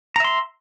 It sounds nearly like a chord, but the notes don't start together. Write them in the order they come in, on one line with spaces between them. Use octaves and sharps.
A#5 E5 C6